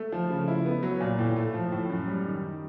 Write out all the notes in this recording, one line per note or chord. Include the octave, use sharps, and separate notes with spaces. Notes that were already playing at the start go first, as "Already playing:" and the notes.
Already playing: A3
F3
C#3
E4
B3
F#3
A#2
A2
A3
F3
A2
F#2
G3
D#3